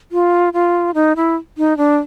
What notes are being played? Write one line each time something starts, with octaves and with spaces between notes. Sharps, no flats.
F4
F4
D#4
E4
D#4
D4